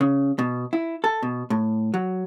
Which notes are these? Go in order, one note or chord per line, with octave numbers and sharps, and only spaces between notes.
C#3
B2
E4
A4
B2
A2
F#3